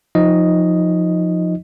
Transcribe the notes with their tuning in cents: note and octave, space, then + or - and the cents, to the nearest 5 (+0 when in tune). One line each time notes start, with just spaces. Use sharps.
F3 +15 D#4 +10 D#5 +0